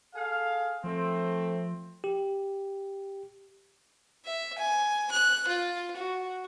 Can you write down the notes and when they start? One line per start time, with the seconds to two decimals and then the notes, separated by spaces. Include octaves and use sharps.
0.14 G#4 A4 F5
0.84 F3 A3 C4
2.04 G4
4.25 E5
4.58 G#5
5.11 F#6
5.47 F4
5.96 F#4